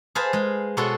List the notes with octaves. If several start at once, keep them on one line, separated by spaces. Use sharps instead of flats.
G#4 B4 C5 F5 G#5 A5
G#3
B2 G#3 F#4 A4 C#5 C6